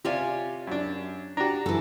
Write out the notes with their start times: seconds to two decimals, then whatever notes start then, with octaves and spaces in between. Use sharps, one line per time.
0.05 C3 F4 G4 C#5 D5 G#5
0.67 F#2 D4
1.37 D4 F#4 G4 A#5
1.66 F#2 E3 A4